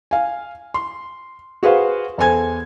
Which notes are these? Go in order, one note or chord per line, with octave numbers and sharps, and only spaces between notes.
F5 G#5
C6
F#4 G#4 B4 C5 F5
E2 A4 C5 G#5 G#6